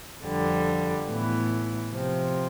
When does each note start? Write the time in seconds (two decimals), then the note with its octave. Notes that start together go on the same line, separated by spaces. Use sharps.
0.25 F2 D3 G3
1.09 A2 E3 B3
1.92 C3 F3 C4